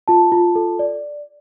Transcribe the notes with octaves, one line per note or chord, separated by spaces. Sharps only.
F4 A5
F4
A4
D5